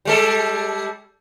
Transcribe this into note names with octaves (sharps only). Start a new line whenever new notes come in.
G3 G#3 A4